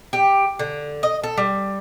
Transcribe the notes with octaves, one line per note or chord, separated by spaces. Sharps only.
G4
D3
D#5
A4
G3